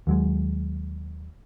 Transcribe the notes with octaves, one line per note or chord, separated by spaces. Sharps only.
D#2 F#3 G#3